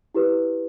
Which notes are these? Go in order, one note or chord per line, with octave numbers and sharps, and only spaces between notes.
E4 G4 B4